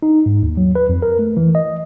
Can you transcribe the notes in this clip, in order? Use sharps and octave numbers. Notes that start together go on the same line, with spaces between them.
D#4
G#2
D#2
F#3
B4
F2
A#4
A3
E3
D#5